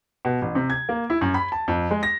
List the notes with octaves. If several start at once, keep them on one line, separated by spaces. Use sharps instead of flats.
B2
A1
C3
G#6
A#3
E4
F#2
B5
A5
F2
G#3
A#6